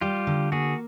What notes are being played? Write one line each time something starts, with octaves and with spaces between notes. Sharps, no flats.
G3 F4 G4
D3
A#3 F#4 G#4